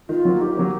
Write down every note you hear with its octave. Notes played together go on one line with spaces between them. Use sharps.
D#3 F4
F#3 A#3
D#3 G4
F#3 A#3